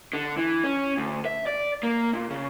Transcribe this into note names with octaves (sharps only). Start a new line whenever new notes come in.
D3
E3
C#4
D2
E5
D5
A#3
A#2
C#3